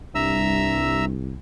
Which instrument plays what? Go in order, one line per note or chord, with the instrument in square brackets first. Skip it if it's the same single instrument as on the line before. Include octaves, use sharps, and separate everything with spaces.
[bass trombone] C2 [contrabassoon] G2 [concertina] E5 A#5 E6